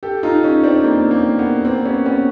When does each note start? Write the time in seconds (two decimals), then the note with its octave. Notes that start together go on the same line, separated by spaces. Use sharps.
0.03 G4 A4
0.23 D#4 F4
0.43 C#4 D#4
0.63 C4 D4
0.84 A#3 C4
1.11 A#3
1.39 B3
1.65 A#3 C4
1.85 B3 C#4
2.06 B3 C#4